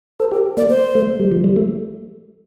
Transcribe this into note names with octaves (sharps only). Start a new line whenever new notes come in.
A4 C5
G4 A#4
A#3 D5
C5
A3
G3
F3
G3
A3